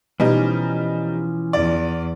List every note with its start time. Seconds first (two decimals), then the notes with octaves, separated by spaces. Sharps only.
0.20 B2 E3 F3 G3 C#4 D#4
1.53 E2 D5